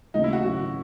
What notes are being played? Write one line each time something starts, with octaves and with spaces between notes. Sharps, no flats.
D#2 C#3 E3 A3 D#4
E4
F#4
G#1 F#2 C#3 F#4